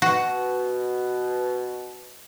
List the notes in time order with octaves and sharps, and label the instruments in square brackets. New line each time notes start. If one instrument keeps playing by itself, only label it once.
[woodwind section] B2 [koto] F#4